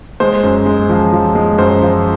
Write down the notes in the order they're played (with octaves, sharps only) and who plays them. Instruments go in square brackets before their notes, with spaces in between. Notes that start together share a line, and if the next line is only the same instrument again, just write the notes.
[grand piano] G#3 C5
F#2
G#3
F3
F3
G#3
F#2 C5
F3